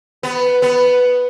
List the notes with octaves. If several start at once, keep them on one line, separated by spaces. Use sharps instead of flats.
B3
B3